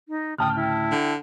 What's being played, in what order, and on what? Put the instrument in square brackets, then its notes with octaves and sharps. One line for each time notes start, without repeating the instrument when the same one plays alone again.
[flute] D#4
[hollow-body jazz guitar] D2 A2 C#3 [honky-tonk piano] G5 A5 F6 [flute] D#6
[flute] E4
[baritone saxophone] D3